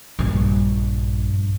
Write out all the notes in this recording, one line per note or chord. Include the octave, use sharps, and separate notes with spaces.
A#1 G2